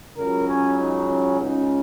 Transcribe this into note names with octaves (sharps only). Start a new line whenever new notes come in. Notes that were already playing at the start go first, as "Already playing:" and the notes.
C#2 C#3 F#3 A#4
C#4
D#4
C#4
C#2 C#3 G#3 D#4